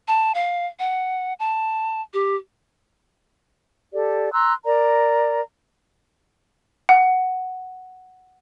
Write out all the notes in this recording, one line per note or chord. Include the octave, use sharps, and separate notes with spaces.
A5
F5
F#5
A5
G4
G4 A4 D5
A#5 C6 E6 F#6
A#4 D5 A#5
F#5